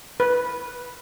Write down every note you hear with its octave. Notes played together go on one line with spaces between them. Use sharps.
B4